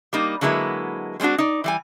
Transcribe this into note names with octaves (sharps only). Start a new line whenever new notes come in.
G3 A#3 D#4
D3 F#3 G#3 A#3 E4 B4
G3 G#3 C4 D4 F#4
D#4 D5
E3 G3 G#5